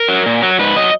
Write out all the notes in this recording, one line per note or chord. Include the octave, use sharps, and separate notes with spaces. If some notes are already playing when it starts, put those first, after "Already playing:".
Already playing: A#4
F#3
A#2
F#3
G#2 B4
F#3 D#5